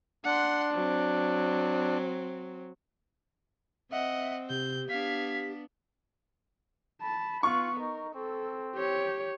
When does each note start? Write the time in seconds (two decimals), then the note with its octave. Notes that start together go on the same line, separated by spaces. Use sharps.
0.25 D4 F#5 C6
0.74 F#3 C4
3.92 C4 D#5 E5 F#5
4.50 C3 G4 G6
4.89 B3 D4 F5 G#6 B6
7.02 A5 B5
7.43 B3 F4 F#5 C#6
7.80 D#4 A#4
8.15 C4 A4
8.75 G4 C#5